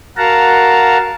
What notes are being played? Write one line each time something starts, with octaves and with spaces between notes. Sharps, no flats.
F#4 A#4 F5 F#5 A5 A#5